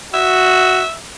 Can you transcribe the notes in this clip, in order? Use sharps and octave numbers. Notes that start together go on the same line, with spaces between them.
F#4 E5